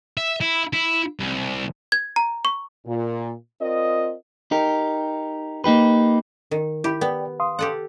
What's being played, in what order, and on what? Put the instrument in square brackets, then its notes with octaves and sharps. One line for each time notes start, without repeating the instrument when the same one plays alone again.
[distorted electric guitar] E5
E4
E4
C2
[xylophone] G#6
A#5
C#6
[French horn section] A#2
C4 F4 A#4 D5 D#5
[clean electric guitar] D#4 G4 A#4
A#3 D#4 G4 B4
[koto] D#3
[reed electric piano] E4 B5 [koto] G4
[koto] B3 [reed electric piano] D5 G5
[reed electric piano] F5 C6 D#6
[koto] G4 A4 F#5